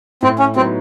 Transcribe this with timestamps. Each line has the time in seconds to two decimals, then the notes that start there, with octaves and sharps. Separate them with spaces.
0.22 A2 C4
0.39 C#4
0.56 F#3 B3 C4 D#4